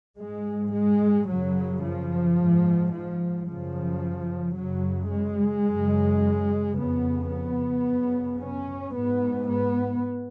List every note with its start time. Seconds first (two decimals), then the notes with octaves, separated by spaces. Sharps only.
0.18 G#2 G#3
0.73 G#3
1.28 F#2 C#3 F#3
1.83 F3
2.37 G#2
2.92 F3
3.46 F#2 C#3 F3
4.56 F#2 C#3 F#3
5.12 G#3
5.66 F#2 C#3
6.75 F2 C#3 B3
7.30 B3
7.85 F#2 C#3
8.39 C#4
8.94 G#2 B3
9.49 B3